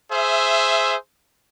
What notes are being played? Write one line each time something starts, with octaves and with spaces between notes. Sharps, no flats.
G#4 C5 E5